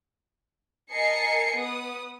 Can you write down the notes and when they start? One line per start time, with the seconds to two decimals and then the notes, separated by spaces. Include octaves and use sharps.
0.91 A#4 D#5 G#5 A5 C7 C#7
1.56 B3 D#6